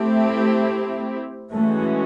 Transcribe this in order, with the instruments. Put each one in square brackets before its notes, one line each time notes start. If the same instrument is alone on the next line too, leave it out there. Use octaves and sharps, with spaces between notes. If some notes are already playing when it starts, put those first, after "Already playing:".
Already playing: [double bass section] A3 [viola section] C4 E4 G4
[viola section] E3 G#3 C#4 F#4 [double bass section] A3